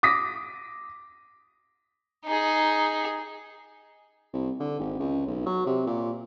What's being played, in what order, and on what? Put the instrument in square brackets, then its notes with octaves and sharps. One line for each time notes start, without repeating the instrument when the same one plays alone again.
[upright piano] D6 D#6 A#6 B6
[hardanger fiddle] D#4 G#4
[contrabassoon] C2
D3
G#1
C#2
B1
F#3
C3
A#2